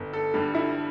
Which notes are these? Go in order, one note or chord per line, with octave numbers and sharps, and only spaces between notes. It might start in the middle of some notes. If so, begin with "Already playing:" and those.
Already playing: G1
A4
G2 D3 G3
E4